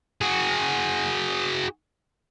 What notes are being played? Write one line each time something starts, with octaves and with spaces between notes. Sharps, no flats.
F#4 G#4